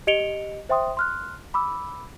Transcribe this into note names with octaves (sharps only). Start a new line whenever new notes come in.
G4 D#5 C#7 D7 F7 G7
C5 E5 G5 C6 D#6
C6 F6 F#6
B5 D6 E6